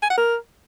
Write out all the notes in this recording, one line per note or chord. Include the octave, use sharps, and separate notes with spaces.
G#5
F#5
A#4